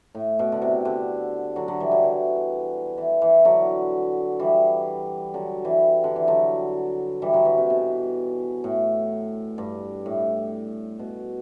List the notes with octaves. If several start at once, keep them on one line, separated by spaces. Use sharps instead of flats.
A2
B2
D3
C3
D3
D3 F#3
D3 F#3
E3 G3
D3 F#3
E3
E3
E3
D3 F#3
E3 G3
D3 F#3
E3 G3
D3
E3
D3 F#3
E3 G3
D3 F#3
E3
C3
B2
A2
G2
A2
B2